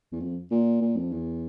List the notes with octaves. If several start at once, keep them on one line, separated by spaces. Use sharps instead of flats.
E2
F2
A#2
A#2
F2
E2